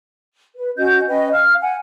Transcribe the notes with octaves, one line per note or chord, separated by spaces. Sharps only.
B4
C#4 F#4 D#5 G6
C#4 B4 D#5 G5
F5 F6
F#5 G#5